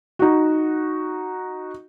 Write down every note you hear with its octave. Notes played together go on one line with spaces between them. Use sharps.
D#4 F#4